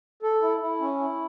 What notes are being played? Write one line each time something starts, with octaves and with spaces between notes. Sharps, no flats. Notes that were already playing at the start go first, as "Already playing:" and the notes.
A4
E4
E4
C#4
E4